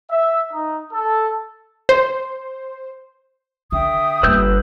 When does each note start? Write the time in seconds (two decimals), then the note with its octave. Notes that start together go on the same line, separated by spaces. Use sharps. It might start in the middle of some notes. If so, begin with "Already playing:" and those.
0.11 E5
0.53 D#4
0.92 A4
1.89 C5
3.72 D3 E5 G5 D#6
4.23 G1 A#3 B4 E6 G6